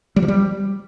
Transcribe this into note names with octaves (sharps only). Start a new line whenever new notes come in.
G3
F3
G3